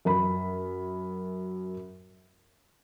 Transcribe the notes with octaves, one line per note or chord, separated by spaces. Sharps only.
F#2 A#4 B5